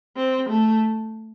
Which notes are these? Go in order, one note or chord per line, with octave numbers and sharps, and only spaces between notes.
C4
A3